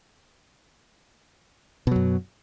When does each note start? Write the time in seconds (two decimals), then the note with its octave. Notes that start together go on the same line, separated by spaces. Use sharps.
1.87 B2
1.91 F#3
1.96 F#2